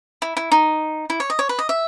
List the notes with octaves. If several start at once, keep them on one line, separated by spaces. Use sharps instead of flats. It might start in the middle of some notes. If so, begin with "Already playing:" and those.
E4
E4
D#4
E4
C#5
D#5
C#5
B4
D#5
E5